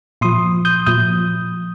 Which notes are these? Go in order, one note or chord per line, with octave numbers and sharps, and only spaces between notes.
A#2 F3 C6 D#6
D#6 G6
A#2 F3 D#6 G6